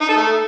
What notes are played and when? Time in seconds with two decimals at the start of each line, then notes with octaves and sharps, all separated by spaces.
0.01 D#4
0.09 A4
0.17 A3